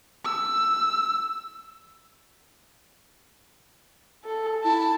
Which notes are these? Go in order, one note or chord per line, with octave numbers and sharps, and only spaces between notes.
E6
A4
E4 A5